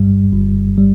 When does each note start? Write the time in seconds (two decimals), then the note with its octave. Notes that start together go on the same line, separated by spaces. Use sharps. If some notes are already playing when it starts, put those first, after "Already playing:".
Already playing: G1 G2 G3
0.33 G1
0.78 G3